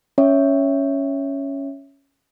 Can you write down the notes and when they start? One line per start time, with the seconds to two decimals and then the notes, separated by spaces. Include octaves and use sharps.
0.18 C#4 C#5 E5